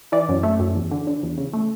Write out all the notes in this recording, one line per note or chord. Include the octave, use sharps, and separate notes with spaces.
E3 D5
F#2
A3
F#2
E2
D3
D3
E2
C#3
A3